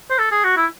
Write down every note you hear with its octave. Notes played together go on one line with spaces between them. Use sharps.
C5
A4
G#4
F#4
E4